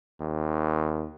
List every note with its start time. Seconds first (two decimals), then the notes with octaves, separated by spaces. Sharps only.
0.21 D#2